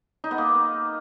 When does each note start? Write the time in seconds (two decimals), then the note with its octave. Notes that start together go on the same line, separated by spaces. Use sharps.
0.24 D#4
0.31 B3
0.38 A#3